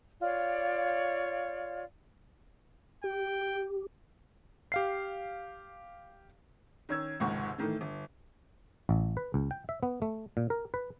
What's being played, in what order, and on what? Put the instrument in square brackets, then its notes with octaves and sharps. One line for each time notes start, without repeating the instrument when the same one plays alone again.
[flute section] F4 C#5 D5 F5
[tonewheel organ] G4 [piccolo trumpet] G5
[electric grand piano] G4 F5 C7
[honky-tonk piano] D#3 C#4 C#5 E6 G#6
F1 C#2 G#2 D#3 F#5 C#6
A2 D#3 E3 A3
G1
[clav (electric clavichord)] A1
B4
C#2
G5
E5
B3
A3
A#2
A#4
B4